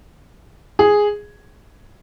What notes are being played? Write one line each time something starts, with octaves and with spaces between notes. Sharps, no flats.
G#4